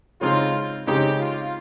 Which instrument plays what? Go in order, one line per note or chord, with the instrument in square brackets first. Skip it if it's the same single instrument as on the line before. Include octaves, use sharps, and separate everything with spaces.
[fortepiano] C#3 G#3 C4 D#4 [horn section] F4
[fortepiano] C#3 G#3 C4 D#4 [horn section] G4
[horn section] F4